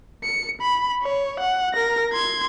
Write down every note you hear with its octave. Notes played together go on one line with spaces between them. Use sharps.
C#7
B5
C#5
F#5
A#4 A#6
C6 G#6